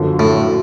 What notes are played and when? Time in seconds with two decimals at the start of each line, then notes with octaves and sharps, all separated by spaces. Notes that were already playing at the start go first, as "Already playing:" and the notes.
Already playing: G1 F#2 D3 F3
0.19 A2